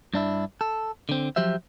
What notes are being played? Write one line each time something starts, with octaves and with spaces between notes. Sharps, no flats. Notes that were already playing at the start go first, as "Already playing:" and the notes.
G2 D4 E4
A4
D3 C4
F3 F#3 G4 C5 E5